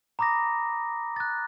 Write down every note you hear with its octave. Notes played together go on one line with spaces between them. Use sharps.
A#5 B5 D6 D#6 A#6
F#6 A6